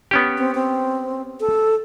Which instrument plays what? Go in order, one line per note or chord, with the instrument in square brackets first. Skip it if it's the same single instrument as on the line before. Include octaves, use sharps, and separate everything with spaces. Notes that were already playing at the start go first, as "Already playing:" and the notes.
[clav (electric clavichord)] B3 C#4 G4
[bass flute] C4
C4
A4